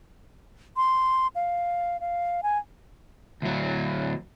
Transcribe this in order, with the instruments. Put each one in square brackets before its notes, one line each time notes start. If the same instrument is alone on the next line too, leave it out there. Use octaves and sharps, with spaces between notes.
[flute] C6
F5
F5
G#5
[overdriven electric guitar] D2 F#3